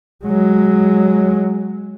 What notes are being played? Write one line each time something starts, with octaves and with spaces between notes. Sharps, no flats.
F#3 G#3